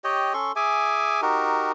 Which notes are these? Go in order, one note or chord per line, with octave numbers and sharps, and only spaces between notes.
G4 C#5 D#5 G5
C#4 A4 C6 C#6
G#4 E5 G#5 D6
D#4 F#4 G4 A#4